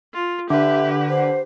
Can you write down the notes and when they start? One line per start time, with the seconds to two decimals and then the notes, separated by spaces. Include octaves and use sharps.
0.14 F4
0.50 D3 G4 B4 E5
1.10 C5